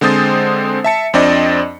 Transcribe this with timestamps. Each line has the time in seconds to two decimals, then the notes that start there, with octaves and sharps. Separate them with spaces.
0.01 D3 G#3 C4 C5 D#6 A6
0.84 E5 A5 C#7
1.14 F2 C4 D4 D5 D#5